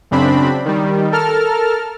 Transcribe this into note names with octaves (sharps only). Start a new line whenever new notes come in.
F#2 C#3 C4 D4 B5
D#3 G3
A4 A#4 A5 F6